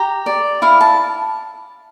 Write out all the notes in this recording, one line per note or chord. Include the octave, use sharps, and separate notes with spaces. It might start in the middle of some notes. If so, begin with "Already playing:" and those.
Already playing: G4 A#5
D5
E4 F5
A5